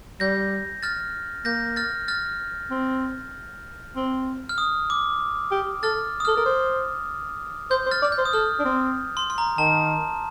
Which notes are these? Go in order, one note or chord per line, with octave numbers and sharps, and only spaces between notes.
G3 G6 A#6
F6 A6
A#3 G6 A#6
F6 A6
F6 A6
C4
C4
F6
D#6
D6
G4
A4 F6 A6
D#6
A4 F6
A#4
C5
C5 G6
C5
F6 A6
D5 F6
G6
C5
D#6
A4 F6
D4
C4
C6
C6
A#5
D#3 A5